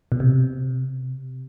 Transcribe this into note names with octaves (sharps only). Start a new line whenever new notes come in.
B2
C3